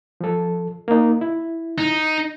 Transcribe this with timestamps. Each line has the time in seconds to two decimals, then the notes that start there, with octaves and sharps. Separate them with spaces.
0.21 F3 A4
0.88 A#3 D#4
1.21 E4
1.78 D#4